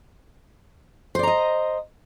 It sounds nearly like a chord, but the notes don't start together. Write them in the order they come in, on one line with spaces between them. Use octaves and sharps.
C5 D5 A#5 D#5